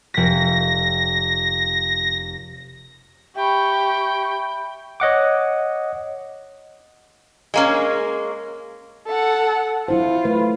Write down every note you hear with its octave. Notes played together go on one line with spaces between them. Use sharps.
F1 A#6 B6
G4 E5 G5 B5 C#6
C#5 D#5 F#5 D6
G#3 A#3 C#4
A4 F#5
F#3 E4 F4 C5
A3 B4